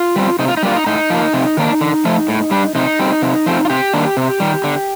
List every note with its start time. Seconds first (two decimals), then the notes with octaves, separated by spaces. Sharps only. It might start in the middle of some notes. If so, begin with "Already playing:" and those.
Already playing: F4
0.16 G3 C4
0.39 C3 D#4
0.48 F4
0.57 D#4
0.63 G3 A#3 D4 F4
0.76 D#4
0.86 A2 D#4
1.10 F3 A#3
1.33 C3
1.57 D#3 A#3 D4
1.81 D3
2.05 F3 A3
2.28 A2
2.51 G3 D4
2.75 C3 D#4
2.99 G3 C4
3.22 C3
3.46 F3 A3 C4
3.65 F4
3.70 C3 G4
3.93 D#3 A#3 D4
4.17 C3
4.40 D#3 G3
4.64 D3